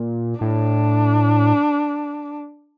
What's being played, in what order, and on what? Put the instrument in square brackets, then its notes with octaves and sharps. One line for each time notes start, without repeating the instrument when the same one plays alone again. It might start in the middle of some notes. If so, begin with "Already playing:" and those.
Already playing: [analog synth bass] A#2
[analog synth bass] A2 [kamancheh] D4